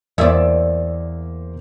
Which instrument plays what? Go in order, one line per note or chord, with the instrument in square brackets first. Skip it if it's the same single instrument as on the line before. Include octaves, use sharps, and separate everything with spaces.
[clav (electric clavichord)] E2 [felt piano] A#3 C5 [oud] D5 E5